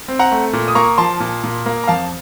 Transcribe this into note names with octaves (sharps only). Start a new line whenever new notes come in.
C4
F#5 A#5
A3
A#2
D#6
A#3 A#5 C#6
F3 A5 C6
A#2
A#2
A#3
A#5
F2 F5 A5